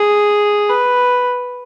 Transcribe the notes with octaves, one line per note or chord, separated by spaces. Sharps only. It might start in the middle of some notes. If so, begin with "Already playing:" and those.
Already playing: G#4
B4